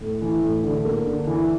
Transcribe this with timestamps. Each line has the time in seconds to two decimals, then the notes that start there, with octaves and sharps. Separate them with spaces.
0.01 A2
0.22 E3
0.43 A2
0.63 D3
0.85 A#3
1.06 D3
1.27 E3